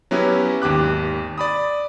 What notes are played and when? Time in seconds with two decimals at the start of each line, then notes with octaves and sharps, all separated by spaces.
0.11 F#3 B3 C#4 E4 G4 B4
0.62 G#1 D#2 G4 D6 F#6
1.38 D5 B5 D#6